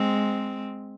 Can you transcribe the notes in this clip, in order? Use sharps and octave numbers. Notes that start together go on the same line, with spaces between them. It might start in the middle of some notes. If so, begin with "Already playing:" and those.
Already playing: G#3 C4